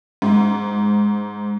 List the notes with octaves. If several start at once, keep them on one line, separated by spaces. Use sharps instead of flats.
G#2